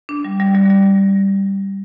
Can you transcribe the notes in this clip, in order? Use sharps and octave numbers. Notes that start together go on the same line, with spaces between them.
D4
G3
G3
G3
G3